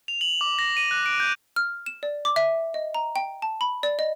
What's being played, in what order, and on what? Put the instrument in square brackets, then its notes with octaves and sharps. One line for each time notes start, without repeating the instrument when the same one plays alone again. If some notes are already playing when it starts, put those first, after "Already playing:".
[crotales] F7
F#7
D6
A#6
D#7
F#6
D7
G6
[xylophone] F6
E7
D5
D6
E5
D#5
A#5
G5
A5
B5
D5
D#5